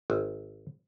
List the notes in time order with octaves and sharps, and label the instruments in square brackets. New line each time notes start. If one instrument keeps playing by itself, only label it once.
[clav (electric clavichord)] G#1